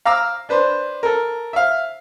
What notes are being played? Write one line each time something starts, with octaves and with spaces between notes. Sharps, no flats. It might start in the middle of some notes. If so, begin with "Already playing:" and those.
F5 A#5 D6 E6 F6
D4 B4 C5
A4 A#4
E5 F5